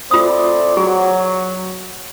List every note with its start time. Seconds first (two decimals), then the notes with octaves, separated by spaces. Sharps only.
0.11 A3 C4 F4 D5 D#6
0.77 F#3 G#4